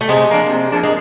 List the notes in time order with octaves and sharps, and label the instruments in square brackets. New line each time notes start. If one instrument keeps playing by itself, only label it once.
[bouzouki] A3
[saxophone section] C3 [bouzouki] G#3
[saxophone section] F3 A#3 D4
C3
F3 A#3 D4
[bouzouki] G#3